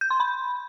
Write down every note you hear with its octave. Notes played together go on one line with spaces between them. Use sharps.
G6
C6
B5